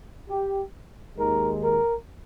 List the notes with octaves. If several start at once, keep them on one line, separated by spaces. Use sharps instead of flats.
G4
D#2 D#3 G#3 A#4
A#4